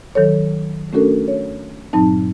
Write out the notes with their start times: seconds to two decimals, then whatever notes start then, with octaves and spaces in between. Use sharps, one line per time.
0.15 D#3 F#3 A4 C#5
0.93 A3 C#4 D4 F#4 A4 A#4
1.28 C#5
1.93 G2 A#2 F#3 C4 D#4 A5